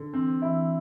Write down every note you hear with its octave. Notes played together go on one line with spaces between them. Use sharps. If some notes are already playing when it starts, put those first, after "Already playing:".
Already playing: D3
E3 C4
E3 E4
E3